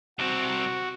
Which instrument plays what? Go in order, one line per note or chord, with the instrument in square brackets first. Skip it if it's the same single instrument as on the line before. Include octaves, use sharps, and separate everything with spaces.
[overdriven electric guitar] C2 C4 [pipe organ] F#4